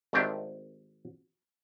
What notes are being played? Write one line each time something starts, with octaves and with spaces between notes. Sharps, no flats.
G#1 D#3 A3 C4 D4 G4